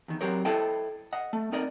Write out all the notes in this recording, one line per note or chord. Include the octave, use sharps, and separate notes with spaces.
E2 D#3
F#3 C4 G4 A#4 C#5
E4 A4 C5 D#5 G5
D#5 F#5
A3
C4 D#4 A#4 D5 D#5